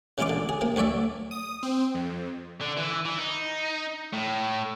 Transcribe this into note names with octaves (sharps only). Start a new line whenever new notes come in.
C#3 E3 G#3 E4 F4 D6
D3
G#4
C3 A#3
D2 F#3 C#5 D5 E5
D#6
C4
F2
D3
E3
E3
D#4
A2